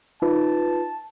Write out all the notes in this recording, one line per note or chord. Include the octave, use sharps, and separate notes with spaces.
D#4 F4 B4 A5